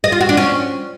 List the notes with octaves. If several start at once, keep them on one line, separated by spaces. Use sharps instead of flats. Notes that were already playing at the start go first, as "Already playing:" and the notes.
D#5
F4
F#4
D4
C#4